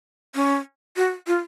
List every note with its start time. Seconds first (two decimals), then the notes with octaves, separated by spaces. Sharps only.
0.35 C#4
0.96 F#4
1.27 F4